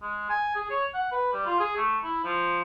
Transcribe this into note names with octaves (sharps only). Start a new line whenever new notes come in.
G#3
G#5
G#4
C#5
F#5
B4
G3
F4
G#4
A3
E4
F3